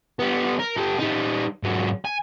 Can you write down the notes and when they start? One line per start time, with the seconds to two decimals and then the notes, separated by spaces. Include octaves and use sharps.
0.19 G3 B3
0.59 A#4
0.77 G4 A4
0.99 G3 D#4
1.63 G#2 F#3
2.05 G#5